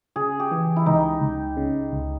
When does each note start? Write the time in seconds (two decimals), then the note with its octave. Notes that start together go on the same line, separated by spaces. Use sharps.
0.16 C#3 G#4
0.40 G4
0.52 E3
0.76 E4
0.86 C#2 D#4
1.21 C#2
1.57 C#3
1.92 C#2